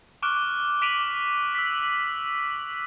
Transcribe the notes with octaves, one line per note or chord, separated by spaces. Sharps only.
C#6 D6 F6 F#6 D7
D6 B6 D7 D#7 F7 F#7
E6 B6